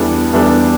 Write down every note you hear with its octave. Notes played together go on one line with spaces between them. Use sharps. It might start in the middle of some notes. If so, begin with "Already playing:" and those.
Already playing: E2 E3 G3 D4 A4
E2 E3 G3 D4 A4